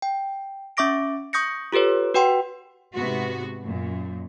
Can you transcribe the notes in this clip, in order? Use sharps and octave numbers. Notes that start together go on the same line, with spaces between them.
G5
C#4 E5 C#6 D6 A#6 D7
C#6 D#6 G6 A#6 C#7
F4 G4 A4 B4 C#5
F#4 B4 F#5 G5 C6
G#2 C3 B3 F#4
F#2 A#2